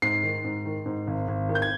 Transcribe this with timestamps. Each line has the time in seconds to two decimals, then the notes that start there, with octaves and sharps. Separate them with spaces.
0.02 G#2 C7
0.23 D#3
0.44 G#2
0.65 D#3
0.86 G#2
1.07 G#1
1.28 G#1
1.49 D#3
1.55 G6
1.62 G#6